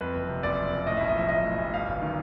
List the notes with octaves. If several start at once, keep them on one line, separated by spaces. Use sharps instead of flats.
F2 B4
F#1
C3
F#1 D5
F2
F#1
A2 D#5
B1 E5
D#5
F3 E5
B1 D#5
A2
B1
G2 F5
G1
D#3